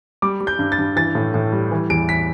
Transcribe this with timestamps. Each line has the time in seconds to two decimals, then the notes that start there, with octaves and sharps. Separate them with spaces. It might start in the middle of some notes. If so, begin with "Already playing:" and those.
0.22 G3 D6
0.41 G3
0.47 G6
0.59 G2
0.72 A6
0.79 G2
0.96 E3 A6
1.15 A2
1.34 A2
1.52 G3
1.71 E3
1.90 E2 D7
2.09 B6